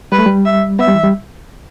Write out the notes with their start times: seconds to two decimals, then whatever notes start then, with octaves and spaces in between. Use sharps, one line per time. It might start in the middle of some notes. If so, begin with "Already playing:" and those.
0.12 G3 B4
0.18 A3
0.26 G3
0.45 E5
0.79 B3 E5
0.88 G3
0.95 E3
1.04 G3